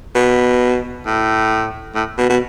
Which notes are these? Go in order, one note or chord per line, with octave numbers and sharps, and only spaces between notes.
B2
A2
A2
B2
B2